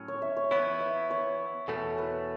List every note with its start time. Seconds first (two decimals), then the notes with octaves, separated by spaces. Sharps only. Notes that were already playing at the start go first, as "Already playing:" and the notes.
Already playing: A2 F#3 C#4
0.08 C#5
0.22 E5
0.37 C#5
0.51 E3 B3 E4 C#5
0.80 E5
1.11 C#5
1.68 E2 B2 A3 A4
1.98 B4